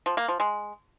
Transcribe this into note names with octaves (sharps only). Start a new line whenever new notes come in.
F3
A#3
F3
G#3